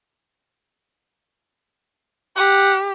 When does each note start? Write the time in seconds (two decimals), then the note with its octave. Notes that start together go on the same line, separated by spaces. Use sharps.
2.37 G4 F#5